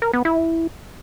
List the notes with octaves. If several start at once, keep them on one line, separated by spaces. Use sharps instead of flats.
A#4
B3
E4